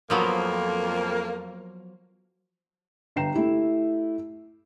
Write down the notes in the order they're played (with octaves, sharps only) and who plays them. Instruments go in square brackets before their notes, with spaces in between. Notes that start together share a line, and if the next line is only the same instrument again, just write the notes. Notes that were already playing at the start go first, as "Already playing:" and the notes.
[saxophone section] F2 A#3 [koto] F3 F#3 B3
[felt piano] G1 G2 G5 A#5 C7 E7
A3 E4 G4